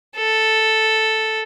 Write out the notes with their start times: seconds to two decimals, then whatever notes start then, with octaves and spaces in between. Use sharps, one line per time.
0.17 A4